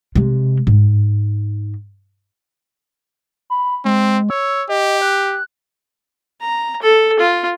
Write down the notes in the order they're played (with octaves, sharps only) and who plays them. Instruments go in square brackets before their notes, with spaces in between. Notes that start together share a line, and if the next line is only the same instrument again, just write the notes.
[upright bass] C3 G#3
G#2
[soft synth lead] B5
[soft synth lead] G#3 [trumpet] C4
[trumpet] C#5 [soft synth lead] E6
[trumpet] G4 [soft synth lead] D#5
[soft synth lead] F#6
[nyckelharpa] A#5
A4
F4